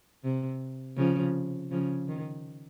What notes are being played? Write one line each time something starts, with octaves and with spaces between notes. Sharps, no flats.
C3
C#3 F3
C#3 F3
D#3